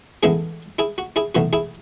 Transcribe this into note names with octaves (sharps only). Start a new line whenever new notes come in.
A1 A2 G#3 B3 E4 G#4
E4 G#4
F#4
E4 G#4
B1 A2 E3 F#4
E4 G#4